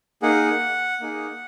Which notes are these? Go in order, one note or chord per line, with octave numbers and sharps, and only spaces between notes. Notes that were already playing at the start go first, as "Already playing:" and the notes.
A#3 D#4 G#4 F#5
A#3 D#4 G#4